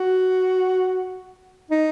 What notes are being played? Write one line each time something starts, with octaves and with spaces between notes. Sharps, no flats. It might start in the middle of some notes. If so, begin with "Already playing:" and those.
Already playing: F#4
D#4